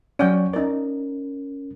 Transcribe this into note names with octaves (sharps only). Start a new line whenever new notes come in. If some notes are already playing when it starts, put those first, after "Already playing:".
F#3 C#4 D5 F#5 G5
C#4 D#4 A#4 D5